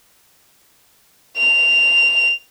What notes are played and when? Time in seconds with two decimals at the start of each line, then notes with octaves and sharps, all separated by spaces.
1.37 F7